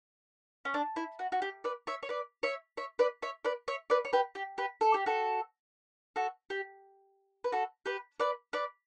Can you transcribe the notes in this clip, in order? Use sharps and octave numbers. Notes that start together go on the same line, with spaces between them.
C#4
D4
E4
F#4
F#4
G4
B4 D5
C#5 E5
C#5
B4 D5
C#5 E5
C#5 E5
B4 D5
C#5 E5
B4 D5
C#5 E5
B4 D5
C#5
G4 B4
G4
G4 B4
A4
G4
F#4 A4
F#4 A4
G4
B4
F#4 A4
G4 B4
B4 D5
B4 D5